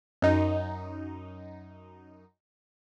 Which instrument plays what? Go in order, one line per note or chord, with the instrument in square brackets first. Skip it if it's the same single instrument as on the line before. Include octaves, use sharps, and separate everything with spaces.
[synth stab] F#2 D#4